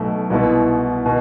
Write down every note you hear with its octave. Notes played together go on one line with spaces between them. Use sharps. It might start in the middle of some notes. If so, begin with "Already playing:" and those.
Already playing: B1 B2 A3
C2 B2 B3 E4
B2